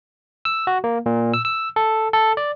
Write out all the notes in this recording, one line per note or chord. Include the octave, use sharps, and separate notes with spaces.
E6
F#4
A#3
A#2
E6
E6
A4
A4
D5